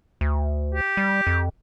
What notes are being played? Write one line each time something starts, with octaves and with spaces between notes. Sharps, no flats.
D2
G4
G3
F2